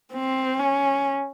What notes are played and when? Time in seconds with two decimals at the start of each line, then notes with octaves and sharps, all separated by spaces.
0.14 C4
0.59 C#4